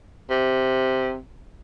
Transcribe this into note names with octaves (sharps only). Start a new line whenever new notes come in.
C3